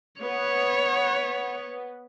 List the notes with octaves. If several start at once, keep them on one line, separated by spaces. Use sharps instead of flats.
B3 C#5